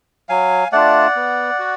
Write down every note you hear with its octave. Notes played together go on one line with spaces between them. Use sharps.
F#3 F5 G#5
A3 D4 F4 D5 F#5
B3
F#4